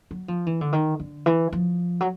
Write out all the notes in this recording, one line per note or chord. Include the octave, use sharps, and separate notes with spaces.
F#3
F3
E3
D3
D#3
D3
E3
F3
F#3